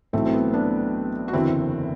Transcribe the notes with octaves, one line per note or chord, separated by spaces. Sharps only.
B1 A2 E3 A3 C4
C4
B3
B3 D4
F#4
F#1 E2 D3 C4 E4